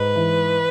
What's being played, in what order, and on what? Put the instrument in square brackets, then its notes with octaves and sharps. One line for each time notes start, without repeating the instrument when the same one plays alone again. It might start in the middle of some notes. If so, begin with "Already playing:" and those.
Already playing: [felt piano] G#2 [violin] B4
[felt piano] E3